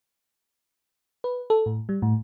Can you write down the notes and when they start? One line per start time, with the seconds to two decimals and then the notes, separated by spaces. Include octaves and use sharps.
1.24 B4
1.50 A4
1.66 A2
1.89 G3
2.02 A2